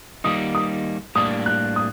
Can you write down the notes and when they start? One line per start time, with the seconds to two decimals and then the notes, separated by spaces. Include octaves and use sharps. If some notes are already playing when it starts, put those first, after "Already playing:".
0.24 D#3 G3 A#3 D#4 D#6
0.55 D#6
1.15 A2 G3 A#3 D4 D#6
1.46 F#6
1.76 D#6